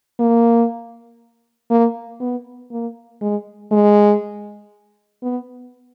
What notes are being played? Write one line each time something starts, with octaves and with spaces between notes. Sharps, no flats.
A#3
A#3
B3
A#3
G#3
G#3
B3